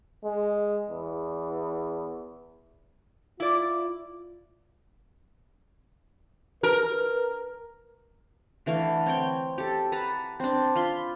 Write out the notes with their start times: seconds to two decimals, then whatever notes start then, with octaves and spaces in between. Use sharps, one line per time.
0.24 G#3
0.89 E2
3.40 E4 F4 D5
6.63 A#4 B4
8.66 D3 E3 A3 F5
9.06 C4 C#5 G5
9.58 G4 A4
9.92 B4 F#5 A5 A#5
10.40 C4 D4
10.76 F4 B5 C6